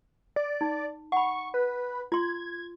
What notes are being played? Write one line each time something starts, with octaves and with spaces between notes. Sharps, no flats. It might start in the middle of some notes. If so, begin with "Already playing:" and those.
D5
D#4
F#5 B5 C#6
B4
F4 C6 G#6